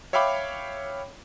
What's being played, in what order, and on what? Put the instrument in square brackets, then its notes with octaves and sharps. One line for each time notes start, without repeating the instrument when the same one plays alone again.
[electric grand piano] C#5 E5 F5 G5 B5 D6